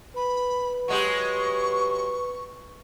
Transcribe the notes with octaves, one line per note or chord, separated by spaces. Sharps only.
B4 B5
F#3 G#3 G4 C#6